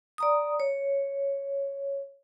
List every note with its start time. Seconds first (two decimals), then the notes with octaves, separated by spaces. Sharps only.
0.18 D5 A#5 D#6
0.60 C#5